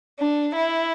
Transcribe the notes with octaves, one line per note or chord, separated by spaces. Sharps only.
D4
E4